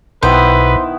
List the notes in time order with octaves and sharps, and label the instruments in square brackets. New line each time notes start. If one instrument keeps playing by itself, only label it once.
[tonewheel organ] B1 B2 [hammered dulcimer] D#3 B3 E4 [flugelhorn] B4 [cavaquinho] C5